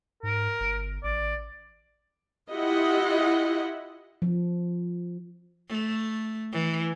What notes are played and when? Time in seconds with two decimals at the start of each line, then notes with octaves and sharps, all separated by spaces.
0.23 G#2 A#4
0.60 G1
1.03 A1 D5
2.51 E4 F4 G4 D#5 F#5
4.22 F3
5.69 A3
6.53 E3